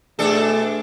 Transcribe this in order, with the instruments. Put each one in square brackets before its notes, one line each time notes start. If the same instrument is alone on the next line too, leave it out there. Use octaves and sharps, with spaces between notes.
[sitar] B2 D4 A4 [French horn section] A3 G#4